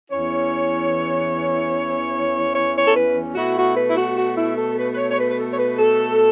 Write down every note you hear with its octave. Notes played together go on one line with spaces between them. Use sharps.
E2 E3 C#4 E4 C#5
C#5
C#5
A4
B4
B2 A3 E4 F#4
F#4
B4
E4
F#4
F#4
E4
A4
B4
B4
C#5
C#5
B4
B4
A4
C#5
B4
A4